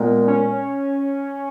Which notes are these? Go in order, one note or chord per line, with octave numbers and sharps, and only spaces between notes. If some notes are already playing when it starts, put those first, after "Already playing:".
Already playing: A#2 G#3 B3
C#4